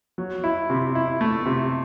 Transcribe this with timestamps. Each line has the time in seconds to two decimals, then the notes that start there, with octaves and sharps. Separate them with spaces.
0.18 F#3
0.44 E4
0.70 C3
0.95 E4
1.21 A3
1.46 C3